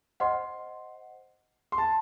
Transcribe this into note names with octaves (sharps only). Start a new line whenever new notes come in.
C5 D#5 F#5 C6
C6
A5